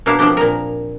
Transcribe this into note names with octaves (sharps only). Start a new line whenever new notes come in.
B2 A#3 D4 E4 F5
F3 C4 D4 G4
A#2 A#4